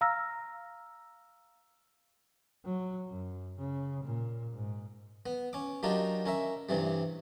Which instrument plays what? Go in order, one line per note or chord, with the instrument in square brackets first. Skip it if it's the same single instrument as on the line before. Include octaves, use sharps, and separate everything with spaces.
[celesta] F5 A#5 E6 F6 A#6
[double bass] F#3
F#2
C#3
A#2
G#2
[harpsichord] B3
C#4 D6
F#3 A#3 D4 D#4 F4 G4
C#4 A#4 E5
G2 C3 E3 G3